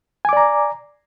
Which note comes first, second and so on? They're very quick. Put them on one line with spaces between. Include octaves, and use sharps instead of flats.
G#5 D6 D5 A#5